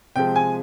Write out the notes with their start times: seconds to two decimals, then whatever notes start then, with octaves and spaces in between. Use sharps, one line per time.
0.16 C3 F3 G#3 G5
0.36 G#5